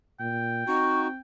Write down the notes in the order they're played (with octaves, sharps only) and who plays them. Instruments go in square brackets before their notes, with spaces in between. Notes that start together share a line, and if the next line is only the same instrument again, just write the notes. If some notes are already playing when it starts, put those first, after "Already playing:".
[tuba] A#2 [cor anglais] G5
[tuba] C4 [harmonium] D#4 F#4 [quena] C#6